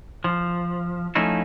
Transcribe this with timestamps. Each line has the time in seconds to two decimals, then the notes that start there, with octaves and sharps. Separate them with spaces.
0.24 F3
1.15 F3 A3 C#4 D#4 E4